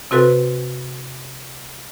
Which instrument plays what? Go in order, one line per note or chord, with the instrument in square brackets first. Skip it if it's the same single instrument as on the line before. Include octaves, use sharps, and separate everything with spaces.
[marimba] C3 C4 F#4 A4 B4